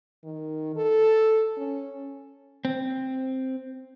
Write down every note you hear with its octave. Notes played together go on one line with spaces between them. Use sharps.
D#3
A4
C#4
C4